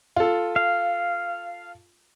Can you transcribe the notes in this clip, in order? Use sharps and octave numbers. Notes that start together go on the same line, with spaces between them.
F4 A4
F5